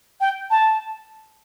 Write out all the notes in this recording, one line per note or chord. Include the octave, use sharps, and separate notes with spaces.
G5
A5